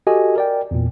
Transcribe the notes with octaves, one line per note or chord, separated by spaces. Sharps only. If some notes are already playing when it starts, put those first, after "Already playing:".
F#4 G4 A4 D#5 G#5
A#4 D5 G5
E2 A#2